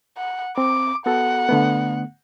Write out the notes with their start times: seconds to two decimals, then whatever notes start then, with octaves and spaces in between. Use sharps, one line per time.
0.17 F#5
0.58 C4 D6
1.06 B3 F#4 A4 F#5
1.49 D3 A3 B3